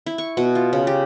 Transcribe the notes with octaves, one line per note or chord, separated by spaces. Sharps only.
E4
C#6
B2
F4
C#3
G4